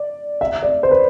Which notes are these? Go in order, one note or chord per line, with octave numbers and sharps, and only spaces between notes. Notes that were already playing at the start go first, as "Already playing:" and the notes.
Already playing: D5
E5
D5
C5
B4